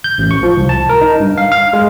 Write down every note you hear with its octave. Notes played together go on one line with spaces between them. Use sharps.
G6
A1
C#6
F3
C2
A5
A#4
D#4
G2
F5
F5
G#3